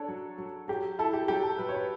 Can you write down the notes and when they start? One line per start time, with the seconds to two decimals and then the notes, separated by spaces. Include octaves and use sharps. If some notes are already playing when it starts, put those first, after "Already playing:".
Already playing: D4 A4 C#5 D5
0.08 F#3
0.38 F#3
0.68 F#3 G4
0.99 E4 A4
1.13 G4
1.28 F#3 G4
1.43 A4
1.58 F#3 B4
1.69 C#5
1.75 B4